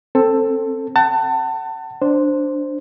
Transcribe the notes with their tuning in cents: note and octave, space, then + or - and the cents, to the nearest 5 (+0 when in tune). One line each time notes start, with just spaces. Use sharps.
C4 +15 A4 +10
F#5 +35 A5 +25
D4 +0 C5 +0